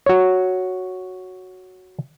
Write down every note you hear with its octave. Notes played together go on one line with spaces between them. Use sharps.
F#4 C#5